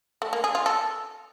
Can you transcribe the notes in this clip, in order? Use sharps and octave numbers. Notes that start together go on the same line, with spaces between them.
A3
A#3
G#4
F4
A4